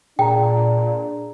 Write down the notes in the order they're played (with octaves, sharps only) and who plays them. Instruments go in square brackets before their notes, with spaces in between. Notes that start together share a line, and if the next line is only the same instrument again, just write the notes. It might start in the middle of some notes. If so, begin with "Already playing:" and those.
[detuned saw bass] A#2 [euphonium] D4 [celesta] G#4 A#5 [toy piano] G5